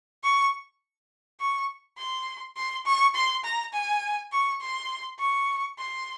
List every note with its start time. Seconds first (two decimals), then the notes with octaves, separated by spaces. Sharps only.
0.23 C#6
1.40 C#6
1.98 C6
2.57 C6
2.86 C#6
3.15 C6
3.44 A#5
3.74 G#5
4.32 C#6
4.61 C6
5.19 C#6
5.78 C6